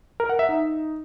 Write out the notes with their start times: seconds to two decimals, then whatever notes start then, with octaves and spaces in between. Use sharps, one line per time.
0.20 A#4
0.29 F#5
0.39 E5
0.49 D#4